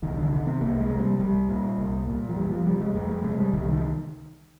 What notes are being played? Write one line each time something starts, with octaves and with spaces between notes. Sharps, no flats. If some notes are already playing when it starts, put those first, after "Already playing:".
C2 D#3
D3
C3 D#3
C4
C2 A#3
G#3
C3
G3
C2 G3
A#2
C2
A#2
F3
F2 G3
F3
C3 G3
G#3
F2 G#3
G#3
C3 G#3
G3
C2 D#3
D#3